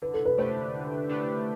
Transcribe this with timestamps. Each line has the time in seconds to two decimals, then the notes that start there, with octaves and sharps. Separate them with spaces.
0.02 D3 B4
0.14 A4
0.25 B4
0.38 A3 D4 G4 B4 C5
0.74 D3
1.09 A3 D4 G4 B4